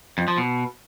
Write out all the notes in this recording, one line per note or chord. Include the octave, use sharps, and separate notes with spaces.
F2
F3
B2